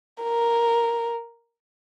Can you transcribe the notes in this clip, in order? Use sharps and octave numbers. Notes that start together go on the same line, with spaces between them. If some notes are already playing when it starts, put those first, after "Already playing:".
A#4